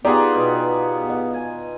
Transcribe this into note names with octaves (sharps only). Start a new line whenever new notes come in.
B3 D#4 F4 G4 G#4 D5 F#5
B2
D#5
G#5